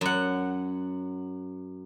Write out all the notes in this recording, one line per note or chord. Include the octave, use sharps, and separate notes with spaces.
F#2 F#5